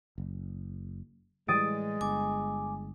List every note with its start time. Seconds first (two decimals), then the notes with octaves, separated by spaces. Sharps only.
0.18 F#1
1.48 A2 E3 G3 G#3 D#6 A6 D7
2.01 G1 G#5 D6